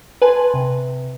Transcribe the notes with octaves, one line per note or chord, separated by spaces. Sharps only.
B4 G#5 A5 C6
C3